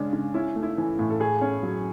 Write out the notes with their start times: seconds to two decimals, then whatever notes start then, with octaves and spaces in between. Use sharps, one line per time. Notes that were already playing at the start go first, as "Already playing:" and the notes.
Already playing: C#3 G#3 C#4 D4
0.13 C#3
0.34 C#4 E4
0.56 A3
0.63 E4
0.78 E3
0.99 A2
1.10 A4
1.20 A2 G#4
1.41 C#4
1.63 F#3